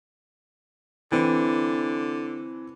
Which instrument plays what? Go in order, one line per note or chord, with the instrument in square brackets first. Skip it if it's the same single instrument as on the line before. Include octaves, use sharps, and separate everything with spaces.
[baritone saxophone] D3 [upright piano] E3 C4